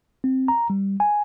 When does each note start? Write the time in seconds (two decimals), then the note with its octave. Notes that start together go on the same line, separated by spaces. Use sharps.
0.24 C4
0.48 A#5
0.70 G3
1.00 G#5